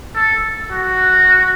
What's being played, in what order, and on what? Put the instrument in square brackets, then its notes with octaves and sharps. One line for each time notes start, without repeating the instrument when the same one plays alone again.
[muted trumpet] A4
F#4